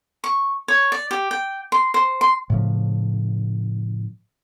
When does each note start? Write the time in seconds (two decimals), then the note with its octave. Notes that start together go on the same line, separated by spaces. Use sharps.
0.24 C#6
0.68 C#5
0.92 D5
1.11 G4
1.31 G5
1.72 C6
1.94 C5
2.21 C6
2.50 A2 C#3 F3